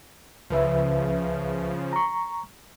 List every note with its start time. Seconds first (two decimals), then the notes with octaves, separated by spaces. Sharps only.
0.50 C#2 C#3 F3 B4 E5
1.93 A#5 C#6